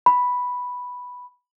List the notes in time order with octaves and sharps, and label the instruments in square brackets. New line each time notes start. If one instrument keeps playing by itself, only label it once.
[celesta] B5